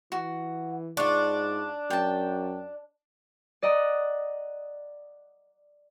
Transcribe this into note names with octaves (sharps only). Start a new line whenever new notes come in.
E3 F#4
G#2 D4 F4 C#6
F#2 G5 A5
D5 D#5 F#5 A#5